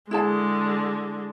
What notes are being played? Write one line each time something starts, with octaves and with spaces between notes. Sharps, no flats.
D3 G#3 E4 G#4 A5